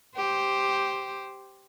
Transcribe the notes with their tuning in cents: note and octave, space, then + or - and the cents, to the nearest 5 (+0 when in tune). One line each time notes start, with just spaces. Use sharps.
G4 +0 C5 +0